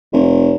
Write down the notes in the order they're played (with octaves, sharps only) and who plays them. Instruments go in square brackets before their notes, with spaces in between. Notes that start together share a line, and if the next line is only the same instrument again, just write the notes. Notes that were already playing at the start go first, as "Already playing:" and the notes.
[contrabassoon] F1